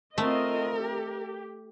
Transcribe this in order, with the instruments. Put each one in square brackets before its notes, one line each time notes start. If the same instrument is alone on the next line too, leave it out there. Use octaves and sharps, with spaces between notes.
[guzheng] A3 [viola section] C4 F4 D#5 [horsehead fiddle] A#4
[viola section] G4